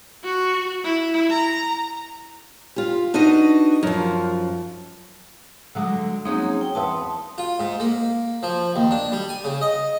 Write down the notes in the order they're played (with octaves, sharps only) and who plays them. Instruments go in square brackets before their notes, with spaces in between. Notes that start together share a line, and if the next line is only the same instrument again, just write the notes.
[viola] F#4
E4
A#5
[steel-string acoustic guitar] F4 G4
D4 D#4 F#4 B4 D#5
F#2 F3
[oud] D3 F#3 G#3
[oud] F#3 C#4 D#4 [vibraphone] A#3 C4 G#4
[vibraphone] G5
[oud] E2 B3 E5 [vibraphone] A5 C6 D#6
[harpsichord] F4
G#2
A#3
F3
D#2
D4
G3
G#5
C#3
D#5